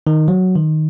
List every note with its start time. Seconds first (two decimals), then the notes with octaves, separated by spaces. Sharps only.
0.07 D#3
0.28 F#3
0.56 D#3